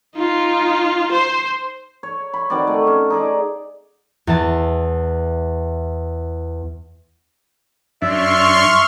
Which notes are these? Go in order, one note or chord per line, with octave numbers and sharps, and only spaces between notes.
D#4 F4
C5
C#5
B5
D#3 C4 F#4 D5
A3
C#4
D#4 G#4 D5
E2 A5
F#2 D4 E5 C6 C#6 F6